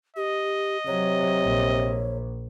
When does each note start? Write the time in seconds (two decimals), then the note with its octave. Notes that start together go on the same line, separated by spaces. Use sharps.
0.16 G4 D#5
0.86 C3 F#3 C#5
1.43 A#1